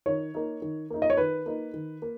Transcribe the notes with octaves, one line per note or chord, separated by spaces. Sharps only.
D#3 C#5
A#3 D#4
D#3
A#3 D#4
D#5
C#5
D#3 B4
A#3 D#4
D#3
A#3